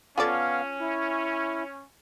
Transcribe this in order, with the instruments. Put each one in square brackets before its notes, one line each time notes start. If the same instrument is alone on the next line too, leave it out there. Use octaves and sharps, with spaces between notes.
[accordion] B3 F5 [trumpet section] C#4 [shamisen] F4 A4 D5
[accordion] E4